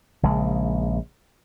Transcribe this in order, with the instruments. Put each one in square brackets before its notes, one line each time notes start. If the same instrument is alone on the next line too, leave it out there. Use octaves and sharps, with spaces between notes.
[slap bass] A#1 C#3 G#3